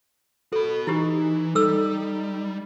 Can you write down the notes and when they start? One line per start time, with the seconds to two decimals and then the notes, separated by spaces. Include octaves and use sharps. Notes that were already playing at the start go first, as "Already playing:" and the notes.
0.53 F#4 A4 B5
0.87 E3 D#4 E4 G4
1.55 G3 D#4 A4 E6